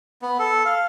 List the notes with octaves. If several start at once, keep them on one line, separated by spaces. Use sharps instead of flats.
B3
A4
F5